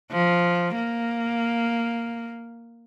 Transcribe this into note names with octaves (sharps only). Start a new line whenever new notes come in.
F3
A#3